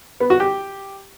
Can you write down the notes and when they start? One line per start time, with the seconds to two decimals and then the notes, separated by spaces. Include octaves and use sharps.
0.20 B3
0.30 F#4
0.40 G4